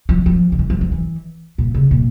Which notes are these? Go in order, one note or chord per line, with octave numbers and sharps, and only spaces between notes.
F3
F3
D3
E3
F3
F3
E3
A#2
C#3
A#2